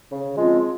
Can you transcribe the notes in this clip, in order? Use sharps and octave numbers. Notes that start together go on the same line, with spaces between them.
C#3
F3 G#3 C4 F4